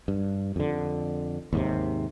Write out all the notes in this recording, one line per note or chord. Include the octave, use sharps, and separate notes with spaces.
G2
F2 D3
D#2 G#2 C3